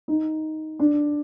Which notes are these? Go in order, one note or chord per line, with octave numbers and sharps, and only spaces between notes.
D#4
D4